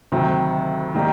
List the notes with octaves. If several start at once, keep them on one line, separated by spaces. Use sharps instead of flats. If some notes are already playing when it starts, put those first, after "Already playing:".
D2 C3 D#3 F#3
D#3 G3 A#3 D#4